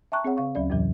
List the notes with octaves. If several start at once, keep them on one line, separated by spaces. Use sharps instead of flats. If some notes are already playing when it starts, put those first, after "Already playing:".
E5 G5 A5 A#5 C#6 F#6
C4 G#4 C#5 F#5
C#3 F5 C#6
D2 F#3 C#4 D5
F2 G#2 C3 E3 F#3